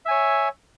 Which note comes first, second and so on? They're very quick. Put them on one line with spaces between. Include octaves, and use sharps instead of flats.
E5 G#5 C#5